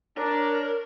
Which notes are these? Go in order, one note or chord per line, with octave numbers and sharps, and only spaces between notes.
D4 A#4 C#5